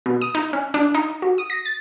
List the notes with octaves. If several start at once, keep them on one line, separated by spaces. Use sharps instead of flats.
B2
D#6
D#4
C#4
D4
D#4
F#4
D#6
A#6
A6